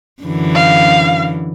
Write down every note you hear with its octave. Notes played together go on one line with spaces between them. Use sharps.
F#2 D3 E3
F5